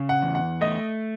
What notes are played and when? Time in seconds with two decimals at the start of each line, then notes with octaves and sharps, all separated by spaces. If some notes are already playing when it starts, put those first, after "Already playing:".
Already playing: C#3
0.09 F#5
0.22 E2
0.35 F#5
0.61 A3 D#5